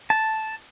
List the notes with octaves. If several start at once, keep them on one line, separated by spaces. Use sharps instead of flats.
A5